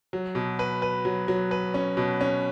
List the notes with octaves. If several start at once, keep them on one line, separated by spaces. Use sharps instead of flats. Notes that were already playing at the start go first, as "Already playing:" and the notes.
F#3
B2
B4
B4
F#3
F#3
B4
C#4
B2
C#4